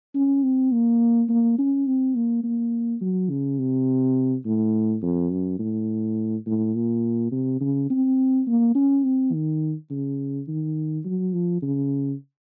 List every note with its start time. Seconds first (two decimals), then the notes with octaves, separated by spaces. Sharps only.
0.15 C#4
0.43 C4
0.72 A#3
1.29 A#3
1.58 C#4
1.86 C4
2.15 A#3
2.44 A#3
3.01 F#3
3.30 C#3
3.59 C3
4.45 A2
5.02 F2
5.32 F#2
5.59 A2
6.46 A2
6.75 A#2
7.32 C3
7.60 C#3
7.90 C4
8.47 A#3
8.75 C#4
9.04 C4
9.33 D#3
9.90 C#3
10.48 D#3
11.05 F#3
11.33 F3
11.62 C#3